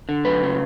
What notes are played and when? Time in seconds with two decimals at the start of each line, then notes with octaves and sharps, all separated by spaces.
0.09 D3
0.25 F#2 B4
0.43 C#3